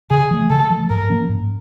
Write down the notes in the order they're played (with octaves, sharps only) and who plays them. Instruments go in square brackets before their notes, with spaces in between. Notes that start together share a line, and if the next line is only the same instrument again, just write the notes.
[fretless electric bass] C#3 [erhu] G#4
[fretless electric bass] F3 A3
[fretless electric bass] C#3 [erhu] A4
[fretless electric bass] F3 A3
[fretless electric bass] G#2 [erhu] A#4
[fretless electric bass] F3 A#3 C#4
G#2